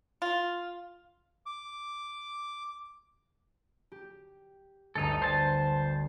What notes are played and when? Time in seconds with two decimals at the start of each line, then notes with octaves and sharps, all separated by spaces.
0.22 F4
1.46 D6
3.92 G4
4.95 G1 D2 D#4 A4
5.22 C5 A5